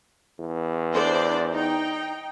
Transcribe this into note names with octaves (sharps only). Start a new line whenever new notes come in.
E2
D4 C5 D5
D#4 G5